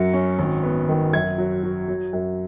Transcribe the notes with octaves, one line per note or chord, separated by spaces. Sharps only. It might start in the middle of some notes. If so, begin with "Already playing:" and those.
Already playing: F#2 F#3 C#7
C#4
G#1
B3
D#3
F#2 G#6
F#3
F#3
F#3
F#2